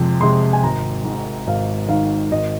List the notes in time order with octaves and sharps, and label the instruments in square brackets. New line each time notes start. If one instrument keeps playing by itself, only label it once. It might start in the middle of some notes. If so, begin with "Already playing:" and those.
Already playing: [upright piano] F2 C3 G#3
C3 G#3 C6
G#5
G#1 A#5
G#2 D#3
G#1 F5
G#2 D#3 F5
G#1 D#5